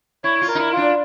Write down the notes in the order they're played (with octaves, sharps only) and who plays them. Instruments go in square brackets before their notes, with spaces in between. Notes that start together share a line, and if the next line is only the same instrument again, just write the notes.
[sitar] E4 [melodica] C#5
[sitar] F4
[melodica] A#4
[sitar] D#4
E4
[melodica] F4
[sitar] D4